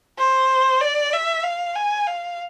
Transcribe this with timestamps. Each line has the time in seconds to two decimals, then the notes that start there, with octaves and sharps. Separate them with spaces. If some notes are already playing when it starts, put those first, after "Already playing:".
0.18 C5
0.81 D5
1.13 E5
1.44 F5
1.75 G#5
2.07 F5